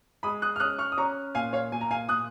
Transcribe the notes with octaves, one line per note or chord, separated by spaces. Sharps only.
G#3 B5 D#6
D#6 F#6
F6
C#4 D#6 F#6
C#6 F6
D#6
C#4 A#5 C#6
A#2 F5 G#5
C#5 F5
A#2 G#5
A#5
F5 G#5
A#2 D#6 F#6